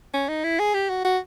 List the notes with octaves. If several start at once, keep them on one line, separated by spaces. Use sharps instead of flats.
C#4
D#4
E4
G#4
G4
F#4
F#4